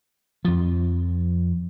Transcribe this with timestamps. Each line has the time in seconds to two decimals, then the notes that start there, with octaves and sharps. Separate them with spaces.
0.45 F2 F3